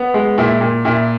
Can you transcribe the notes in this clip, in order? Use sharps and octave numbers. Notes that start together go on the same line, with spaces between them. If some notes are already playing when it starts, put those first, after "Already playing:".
Already playing: B3
G#3
A#2 E4
A#2
A#2 E4